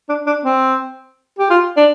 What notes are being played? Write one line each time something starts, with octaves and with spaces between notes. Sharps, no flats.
D4
D4
C4
G4
F4
D4